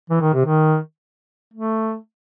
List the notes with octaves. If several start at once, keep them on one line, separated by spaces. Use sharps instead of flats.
E3
D#3
C3
D#3
A3